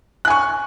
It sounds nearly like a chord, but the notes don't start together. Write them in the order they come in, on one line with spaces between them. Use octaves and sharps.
F#6 G#5 C#6